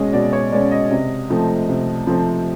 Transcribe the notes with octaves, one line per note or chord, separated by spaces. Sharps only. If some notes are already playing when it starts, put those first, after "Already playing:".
Already playing: B2 G#3 C#4 D#5
B2 D5
C#5
G#3 C#4 D5
D#5
C3
F3 A3 C4
C3
F3 A3 C4